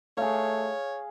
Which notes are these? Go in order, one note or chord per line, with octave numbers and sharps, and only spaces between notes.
A3 G#4 C#5 F5